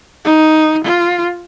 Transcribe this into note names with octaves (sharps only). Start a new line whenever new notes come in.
D#4
F4